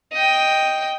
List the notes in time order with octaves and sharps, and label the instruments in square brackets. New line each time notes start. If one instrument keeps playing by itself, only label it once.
[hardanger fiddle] D#5 G5